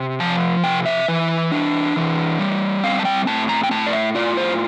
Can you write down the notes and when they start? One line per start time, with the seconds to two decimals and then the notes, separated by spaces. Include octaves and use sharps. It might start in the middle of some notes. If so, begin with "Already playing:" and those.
Already playing: C3
0.20 F3 A5
0.64 C3 G5
0.86 E5
1.08 E3
1.52 D4
1.96 E3
2.39 G3
2.83 C4 F5
2.99 A5
3.05 G5
3.27 A2 A5
3.49 A#5
3.64 G5
3.71 A2 A5
3.87 D5
3.93 E5
4.15 F4 D5
4.37 C5